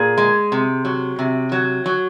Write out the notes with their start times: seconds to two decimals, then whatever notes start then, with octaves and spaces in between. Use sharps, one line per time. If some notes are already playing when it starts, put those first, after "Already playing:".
Already playing: A#2 G#4
0.18 G#3
0.52 C3
0.85 F#3
1.19 C3
1.52 F#3
1.86 F#3